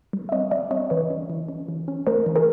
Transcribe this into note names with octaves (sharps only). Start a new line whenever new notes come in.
G3
E5
C4 C#5 D#5
G3 D5 E5
C4 C#5 D#5
E3 B4 C#5
C#4
E3
C#4
E3
C#4
A3 A#4 C5
E3
G#4 A#4